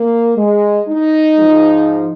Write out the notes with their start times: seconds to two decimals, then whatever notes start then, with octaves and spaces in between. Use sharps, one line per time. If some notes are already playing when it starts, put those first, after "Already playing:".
Already playing: A#3
0.37 G#3
0.87 D#4
1.37 G#2 F3